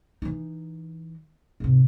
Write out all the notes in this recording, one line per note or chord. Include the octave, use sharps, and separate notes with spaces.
E3 D#4
G#2 C3